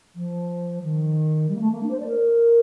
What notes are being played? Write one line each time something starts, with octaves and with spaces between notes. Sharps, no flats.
F3
D#3
G3
A#3
A3
A#3
D4
C5
D5
A#4